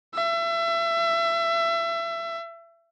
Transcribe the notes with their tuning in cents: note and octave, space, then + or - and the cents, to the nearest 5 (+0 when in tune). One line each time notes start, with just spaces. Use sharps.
E5 +30